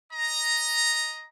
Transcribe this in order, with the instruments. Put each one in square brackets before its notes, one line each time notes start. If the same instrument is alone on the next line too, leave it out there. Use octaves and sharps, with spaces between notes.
[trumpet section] D#5 A#5